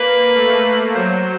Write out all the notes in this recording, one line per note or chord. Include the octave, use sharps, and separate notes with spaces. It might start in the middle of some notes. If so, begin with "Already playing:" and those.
Already playing: A#3 B4
A3
F#3 C5